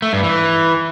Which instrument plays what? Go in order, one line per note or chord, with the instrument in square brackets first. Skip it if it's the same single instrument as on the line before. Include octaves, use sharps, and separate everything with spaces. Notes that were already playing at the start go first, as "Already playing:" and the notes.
[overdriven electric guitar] A3
G2
E3